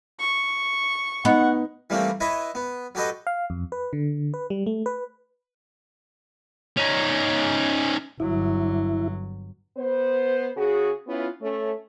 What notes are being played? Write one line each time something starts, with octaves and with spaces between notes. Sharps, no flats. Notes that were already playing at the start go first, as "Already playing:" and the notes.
C#6
B3 D#4 F#5
E3 G3 A3 A#3 C4
E4 B4 C#5 D#5 E5
B3
F#3 G4 A4 B4 D#5
F5
F2
B4
D3
B4
G3
A3
B4
C#4 D#4
G1 F#3 E4
B3 C5
C#3 F#4 G#4
B3 C#4 E4 F4
A3 C#4